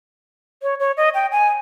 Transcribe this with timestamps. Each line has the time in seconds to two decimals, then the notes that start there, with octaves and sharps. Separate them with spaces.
0.63 C#5
0.80 C#5
0.97 D#5
1.14 G5
1.32 G#5